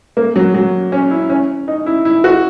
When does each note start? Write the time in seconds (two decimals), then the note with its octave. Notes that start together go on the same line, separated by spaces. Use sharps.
0.17 A#3
0.36 F#3
0.54 F#3
0.92 C#4
1.11 E4
1.30 C#4
1.68 D#4
1.86 E4
2.05 E4
2.24 F#4